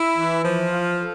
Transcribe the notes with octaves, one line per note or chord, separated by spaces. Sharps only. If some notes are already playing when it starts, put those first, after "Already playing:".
Already playing: E4
E3
F3
F4
A4